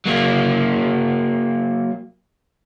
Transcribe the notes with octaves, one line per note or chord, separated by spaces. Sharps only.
F#3 A#3